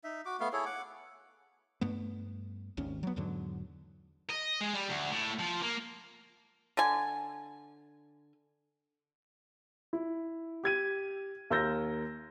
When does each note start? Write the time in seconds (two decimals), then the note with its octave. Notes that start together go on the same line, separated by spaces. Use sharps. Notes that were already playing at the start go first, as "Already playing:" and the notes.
0.04 D#4 E5
0.26 F#4 D6
0.40 A3 B3 F5
0.53 E4 G#4 A4 C#5
0.66 F#5 D6
1.81 G2 A3 B3
2.77 G#1 D#2 C#4
3.03 F#3 B3
3.16 E2 G#2 D3 F#3
4.30 D#5
4.61 G#3
4.73 G3
4.89 D2
5.12 A2
5.39 F3
5.62 A#3
6.77 D3 G#5
9.93 E4
10.64 G4 G#6 D#7
11.50 D#2 A#4 E6 G6 A#6